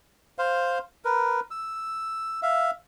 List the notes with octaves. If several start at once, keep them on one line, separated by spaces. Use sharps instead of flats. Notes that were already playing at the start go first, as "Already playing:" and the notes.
C5 F5
A#4 B4
E6
E5 F5